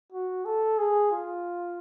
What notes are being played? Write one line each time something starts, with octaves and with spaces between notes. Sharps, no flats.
F#4
A4
G#4
F4